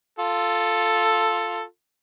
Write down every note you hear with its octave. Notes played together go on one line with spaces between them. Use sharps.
F4 A4